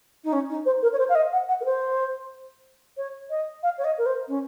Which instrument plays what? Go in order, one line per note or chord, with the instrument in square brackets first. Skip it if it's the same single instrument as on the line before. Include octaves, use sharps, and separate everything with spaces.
[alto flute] D#4
C#4
D#4
C5
A#4
C#5
C5
F5
D#5
F#5
F#5
A#4
C5
C#5
D#5
F5
C#5
D#5
A#4
C5
C#4